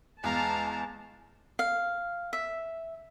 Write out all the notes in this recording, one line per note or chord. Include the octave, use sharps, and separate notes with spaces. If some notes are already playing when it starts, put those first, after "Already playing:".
E2 G#3 F5 A5 A#5
F5
E5